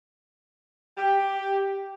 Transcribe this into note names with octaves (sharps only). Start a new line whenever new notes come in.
G4